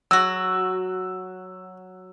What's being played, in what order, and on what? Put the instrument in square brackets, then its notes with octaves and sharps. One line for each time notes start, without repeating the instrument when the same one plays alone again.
[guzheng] F#3 F#4 [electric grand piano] E6